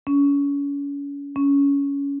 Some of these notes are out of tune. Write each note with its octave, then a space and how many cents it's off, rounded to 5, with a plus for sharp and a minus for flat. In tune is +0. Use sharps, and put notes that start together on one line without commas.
C#4 +35
C#4 +20